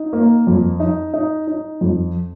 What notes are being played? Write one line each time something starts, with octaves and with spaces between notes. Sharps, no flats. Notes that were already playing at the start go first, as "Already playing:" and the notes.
Already playing: D#4
A#3
F2
D#4
D#4
D#4
F2